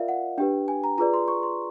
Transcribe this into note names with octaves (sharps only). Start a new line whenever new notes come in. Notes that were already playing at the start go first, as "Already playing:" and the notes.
Already playing: F4 A#4 D5 E5 F5
F#5
D4 G4 B4 G5
G#5
A#5
F4 G#4 B4 D5 A#5
C6
C#6
C6